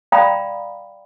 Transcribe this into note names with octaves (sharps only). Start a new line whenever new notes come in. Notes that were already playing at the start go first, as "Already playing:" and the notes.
D5 F5 G5 A#5 B5 D#6